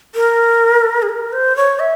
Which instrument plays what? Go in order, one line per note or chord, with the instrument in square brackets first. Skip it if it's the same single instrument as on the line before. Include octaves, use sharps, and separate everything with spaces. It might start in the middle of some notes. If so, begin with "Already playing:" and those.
[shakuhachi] A#4
G#4
A#4
C5
C#5
E5